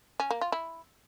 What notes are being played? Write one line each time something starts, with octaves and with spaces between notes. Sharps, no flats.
C#4
A#3
F4
E4